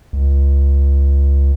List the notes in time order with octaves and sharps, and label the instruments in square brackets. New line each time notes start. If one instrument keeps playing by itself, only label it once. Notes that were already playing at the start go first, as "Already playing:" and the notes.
[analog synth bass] C#2